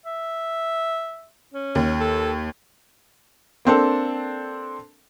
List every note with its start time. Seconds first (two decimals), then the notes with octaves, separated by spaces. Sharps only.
0.06 E5
1.54 C#4
1.75 D#2
1.99 A4
3.65 A#3 C4 D4 A4